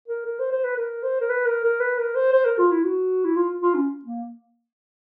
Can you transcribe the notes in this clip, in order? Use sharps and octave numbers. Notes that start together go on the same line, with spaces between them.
A#4
A#4
C5
C5
B4
A#4
C5
A#4
B4
A#4
A#4
B4
A#4
C5
C5
A#4
F4
E4
F#4
E4
F4
F4
C#4
A#3